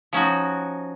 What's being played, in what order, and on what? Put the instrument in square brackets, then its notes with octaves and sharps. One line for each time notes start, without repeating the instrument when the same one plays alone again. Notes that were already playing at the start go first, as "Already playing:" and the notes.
[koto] F3 C#4 D#4 F#4